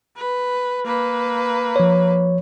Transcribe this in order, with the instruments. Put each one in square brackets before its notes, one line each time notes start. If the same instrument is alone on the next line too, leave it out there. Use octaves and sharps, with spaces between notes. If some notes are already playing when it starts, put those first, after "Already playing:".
[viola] B4
A#3 B4
[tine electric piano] F3 C#5